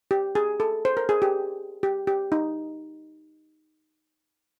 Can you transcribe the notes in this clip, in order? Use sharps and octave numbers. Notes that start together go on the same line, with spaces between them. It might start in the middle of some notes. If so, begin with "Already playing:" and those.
G4
G#4
A4
C5
A#4
G#4
G4
G4
G4
D#4